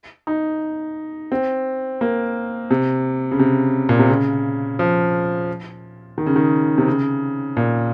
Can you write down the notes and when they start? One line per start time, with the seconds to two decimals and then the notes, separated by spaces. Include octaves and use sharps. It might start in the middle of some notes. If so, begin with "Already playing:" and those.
0.27 D#4
1.32 C4
2.01 A#3
2.71 C3
3.32 C#3
3.39 C3
3.89 A#2
3.99 C3
4.09 C#3
4.79 F3
6.18 D#3
6.27 C#3
6.36 D#3
6.78 C3
6.88 C#3
7.57 A#2